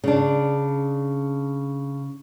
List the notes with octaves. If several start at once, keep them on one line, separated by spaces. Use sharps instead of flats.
C#3 D4